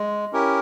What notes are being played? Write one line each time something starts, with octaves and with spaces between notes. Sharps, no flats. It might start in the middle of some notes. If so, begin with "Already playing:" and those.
Already playing: G#3
C#4 E4 G4 A#4